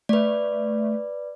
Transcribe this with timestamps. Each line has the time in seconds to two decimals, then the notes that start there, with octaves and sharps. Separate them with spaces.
0.09 A3 B4 D5